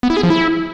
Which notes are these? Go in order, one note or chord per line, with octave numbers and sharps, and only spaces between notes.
B3
E4
G#4
F3
E4